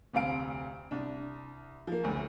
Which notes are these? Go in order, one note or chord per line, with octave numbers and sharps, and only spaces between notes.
F1 D2 C4 F5 D7
C2 D4
F3 A#3
F#1 D2